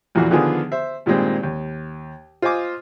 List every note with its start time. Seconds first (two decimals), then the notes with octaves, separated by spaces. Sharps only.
0.15 A#1 E2 A#2 E3 F#4
0.31 D3 D#3 F3 B3 F4 G#4
0.72 C5 E5
1.06 G2 A#2 D#3 G#3 C4
1.43 D#2
2.42 F4 C5 D#5 G#5 D6